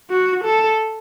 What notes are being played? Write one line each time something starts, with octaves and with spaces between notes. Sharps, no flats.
F#4
A4